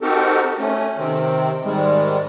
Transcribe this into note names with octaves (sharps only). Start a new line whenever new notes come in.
C4 D#4 F#4 G4 A4 A#4
A3 C#4
C3 D#3 C4
G#2 D#3 G3 G#3